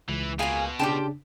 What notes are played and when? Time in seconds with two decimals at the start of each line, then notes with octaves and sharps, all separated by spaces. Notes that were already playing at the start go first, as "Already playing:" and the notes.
0.09 C#2 E3
0.39 B2 A#3 F4 G#4 F5 G#5
0.79 C#3 D4 F4 G4 G5 A5